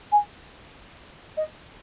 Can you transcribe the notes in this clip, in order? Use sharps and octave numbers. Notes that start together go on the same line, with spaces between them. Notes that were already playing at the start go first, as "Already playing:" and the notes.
G#5
D#5